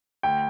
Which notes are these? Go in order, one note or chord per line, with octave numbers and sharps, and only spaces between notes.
D2 G5